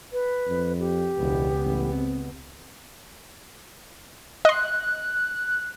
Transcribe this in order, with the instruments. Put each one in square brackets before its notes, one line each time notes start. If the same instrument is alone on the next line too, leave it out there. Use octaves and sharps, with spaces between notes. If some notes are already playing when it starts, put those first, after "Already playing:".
[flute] B4
[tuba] F2
[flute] G4
[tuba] E1 [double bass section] C#2 B3
[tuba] A1
C4
[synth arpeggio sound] D#5 C6 [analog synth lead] F#6